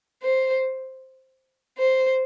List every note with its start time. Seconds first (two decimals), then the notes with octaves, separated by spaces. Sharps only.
0.23 C5
1.78 C5